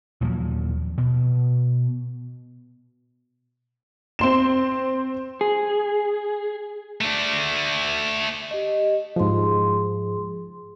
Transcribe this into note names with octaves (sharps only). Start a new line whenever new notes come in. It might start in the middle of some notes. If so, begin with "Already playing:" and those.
D#2 A#2 F3 F#3
B2
C4 C6 E7
G#4
A3 D4
G4 D#5
G#2 F3 G#4 C6